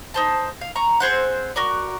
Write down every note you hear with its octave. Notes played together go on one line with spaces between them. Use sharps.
D#4 C5 A5
F5
A#5 C#6
C4 G#4 C5 F#5
F#4 A#4 D5